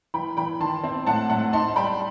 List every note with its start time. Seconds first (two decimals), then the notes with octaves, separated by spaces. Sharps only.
0.14 E3 G5 B5
0.37 E3 G5 B5
0.60 D#3 A5 C6
0.84 C4
1.07 A2 F#5 A5
1.30 A2 F#5 A5
1.53 D#4 A5 C6
1.76 G3 G5 B5